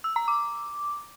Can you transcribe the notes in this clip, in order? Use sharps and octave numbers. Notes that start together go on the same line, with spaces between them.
E6
A#5
D6